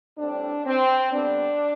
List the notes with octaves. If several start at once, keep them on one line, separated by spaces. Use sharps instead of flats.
A2 G3 C4 D4
C4
G2 D3 G3 B3 D4